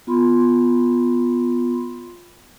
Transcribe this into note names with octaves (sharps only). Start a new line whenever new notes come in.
B3 F4 B5 C6